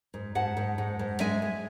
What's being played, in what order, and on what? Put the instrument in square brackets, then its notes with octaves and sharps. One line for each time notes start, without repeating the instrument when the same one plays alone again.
[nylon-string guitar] G#2
G#2 F#5 A5
G#2
G#2
G#2
G#3 E5 G#5
G#3